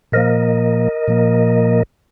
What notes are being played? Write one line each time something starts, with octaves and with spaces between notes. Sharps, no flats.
A#2 F3 A#3 A#4 D#5
A#2 F3 A#3